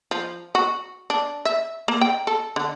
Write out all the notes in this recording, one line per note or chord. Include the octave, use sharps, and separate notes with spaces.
F3
F#4
D4
E5
A#3
G5
A4
D3